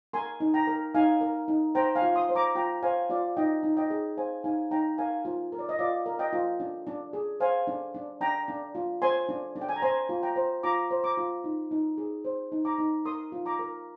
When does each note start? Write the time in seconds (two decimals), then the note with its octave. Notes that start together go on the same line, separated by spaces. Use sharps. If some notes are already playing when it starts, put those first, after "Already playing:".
0.13 A#4 G#5 C6
0.40 D#4
0.54 G5 A#5
0.67 A#4
0.94 D#4 F5 G#5
1.21 A#4
1.48 D#4
1.75 C5 G5 A#5
1.95 F5 G#5
2.02 F4
2.16 C6 D#6
2.29 C5
2.35 A#5 D6
2.55 F4 G5 A#5
2.83 C5 F5 G#5
3.10 F4 D5 F5
3.37 D#4 D#5 G5
3.63 D#4
3.77 D#5 G5
3.90 G#4
4.17 C5 F5 G#5
4.44 D#4 F5 G#5
4.71 D#4 G5 A#5
4.98 A#4 F5 G#5
5.25 F4
5.52 A#4
5.59 D5
5.69 D#5
5.79 F4 D5 F5
6.06 A#4
6.19 D#5 G5
6.33 F4
6.60 D4
6.87 D4
7.13 G#4
7.40 C5 F5 G#5
7.67 D4
7.94 D4
8.21 D4 G5 A#5
8.48 D4
8.75 F4
9.02 C5 G#5 C6
9.29 D4
9.56 D4
9.61 G5
9.69 G#5
9.76 A#5
9.82 C5 G#5 C6
10.09 F4
10.23 G5 A#5
10.36 C5
10.63 F4 A#5 D6
10.91 C5
11.04 A#5 D6
11.18 F4
11.44 D#4
11.71 D#4
11.98 G#4
12.25 C5
12.52 D#4
12.65 A#5 D6
12.78 D#4
13.05 A#4 C6 D#6
13.32 F4
13.46 A#5 D6
13.59 A#4